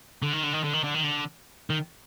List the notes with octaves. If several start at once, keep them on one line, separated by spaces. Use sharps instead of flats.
D3
D#3
D3
D#3
D3
D#3
D3
D#3
D3
D#3